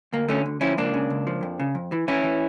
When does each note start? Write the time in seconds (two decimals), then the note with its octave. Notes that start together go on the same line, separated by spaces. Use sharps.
0.13 D2 A#3
0.28 D3 A3 C#4
0.46 D2
0.61 F3 C#4 E4
0.78 C#2 A#3 D4
0.94 C#3
1.10 C#2
1.27 F3
1.43 F2
1.60 C#3
1.75 F2
1.92 E3
2.08 E3 C#4 E4
2.24 E3